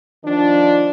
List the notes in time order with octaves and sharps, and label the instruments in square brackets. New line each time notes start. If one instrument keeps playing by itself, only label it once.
[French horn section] D#3 F3 D4